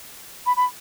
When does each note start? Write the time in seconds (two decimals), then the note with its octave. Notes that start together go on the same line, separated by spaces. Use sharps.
0.46 B5
0.56 B5